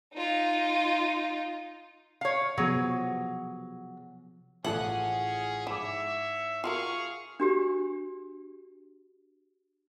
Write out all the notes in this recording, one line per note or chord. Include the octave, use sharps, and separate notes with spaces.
D#4 F4
C#5 F5
C3 F3 F#3 B3 G#4
A1 F3 C#4 E4 G#4 A4 D5 F#5
G#2 E4 C#5 E5 D6
F4 F#4 G#4 A#4 F5 C#6
D4 F#4 G4